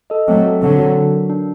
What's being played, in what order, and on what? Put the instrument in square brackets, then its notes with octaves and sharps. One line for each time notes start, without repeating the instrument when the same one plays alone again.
[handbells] A4 D#5
[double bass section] F#3 A3 [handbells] C4
[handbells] F#4 A4
[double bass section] D3 F#3 [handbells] C4
[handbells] F#4 A4
D4
F#4 A#4
D4